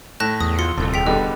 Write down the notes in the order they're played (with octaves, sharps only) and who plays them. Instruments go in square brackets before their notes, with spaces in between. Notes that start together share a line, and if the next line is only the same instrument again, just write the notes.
[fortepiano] A2 [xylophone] A5 F#6 A#6
[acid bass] E2 [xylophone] D#6
[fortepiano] F4 [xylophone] C6 C#7
[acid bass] D#1 [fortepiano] C2 F2
[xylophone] G#4 G5 B6
[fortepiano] D3 G3 B3 [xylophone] D#5